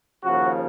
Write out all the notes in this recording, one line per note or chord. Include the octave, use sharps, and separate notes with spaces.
D#2 C#3 F3 F#4